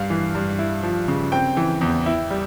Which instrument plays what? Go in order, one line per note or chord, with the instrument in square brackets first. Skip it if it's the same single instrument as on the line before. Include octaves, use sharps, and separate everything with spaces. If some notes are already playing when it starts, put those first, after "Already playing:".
Already playing: [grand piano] G2 F5
E3
G2
E4
F3
C#3
C4 G5
E3
E2
E4
G3